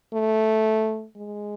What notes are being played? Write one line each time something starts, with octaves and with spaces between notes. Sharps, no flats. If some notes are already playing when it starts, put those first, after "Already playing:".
A3
G#3